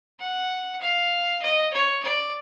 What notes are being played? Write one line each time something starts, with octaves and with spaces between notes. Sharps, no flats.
F#5
F5
D#5
C#5
D5